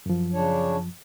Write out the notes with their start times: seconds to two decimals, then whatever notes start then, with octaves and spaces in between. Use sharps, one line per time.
0.06 F#2 F3
0.34 C#3 D4 C#5